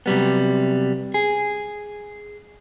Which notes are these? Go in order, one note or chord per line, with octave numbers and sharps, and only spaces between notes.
C3 F#3 G3 B3
G#4